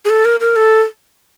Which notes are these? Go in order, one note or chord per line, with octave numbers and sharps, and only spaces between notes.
G#4
A4
A#4
A#4
A4